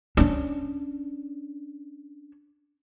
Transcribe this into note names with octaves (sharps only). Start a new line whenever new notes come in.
C#4 D4